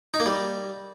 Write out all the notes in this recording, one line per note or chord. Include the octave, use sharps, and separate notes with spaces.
D#4
A#3
G3